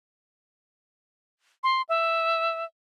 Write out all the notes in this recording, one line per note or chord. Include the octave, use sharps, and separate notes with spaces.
C6
E5